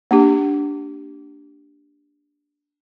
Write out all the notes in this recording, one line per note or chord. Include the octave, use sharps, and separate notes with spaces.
A#3 D4 G4